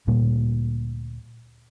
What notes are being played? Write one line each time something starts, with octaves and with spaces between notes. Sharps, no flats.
D2 A#2 G3 A#3